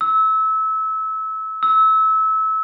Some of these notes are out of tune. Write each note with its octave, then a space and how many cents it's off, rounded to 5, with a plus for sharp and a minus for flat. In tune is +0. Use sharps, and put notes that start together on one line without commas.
E6 -25
E6 -25